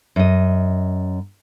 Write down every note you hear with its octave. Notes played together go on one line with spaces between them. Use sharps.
F#2 D#5